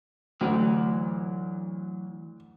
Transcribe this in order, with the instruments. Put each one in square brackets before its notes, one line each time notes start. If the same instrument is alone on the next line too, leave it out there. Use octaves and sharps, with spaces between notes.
[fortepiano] D2 [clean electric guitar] E3 F#3